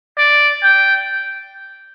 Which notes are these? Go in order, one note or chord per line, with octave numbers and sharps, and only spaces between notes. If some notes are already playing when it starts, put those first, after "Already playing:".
D5
G5